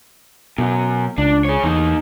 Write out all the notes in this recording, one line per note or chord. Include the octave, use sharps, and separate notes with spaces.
F#2 B2 F#3
C#2 D4
G#4 C#5
E2 A#3 D#4